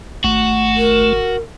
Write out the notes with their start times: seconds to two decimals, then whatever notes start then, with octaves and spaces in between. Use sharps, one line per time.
0.24 G#1 A3 F#4
0.76 A#4